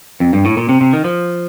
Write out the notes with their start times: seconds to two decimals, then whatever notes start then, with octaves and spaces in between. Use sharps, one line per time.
0.20 F2
0.33 G2
0.45 A2
0.57 A#2
0.69 C3
0.81 C3
0.93 D#3
1.04 F3